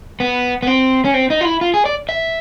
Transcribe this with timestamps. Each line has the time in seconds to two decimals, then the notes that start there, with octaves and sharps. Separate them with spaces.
0.20 B3
0.63 B3
0.67 C4
1.05 C#4
1.14 C4
1.30 D#4
1.41 F4
1.45 E4
1.61 F4
1.74 G#4
1.86 D5
2.09 E5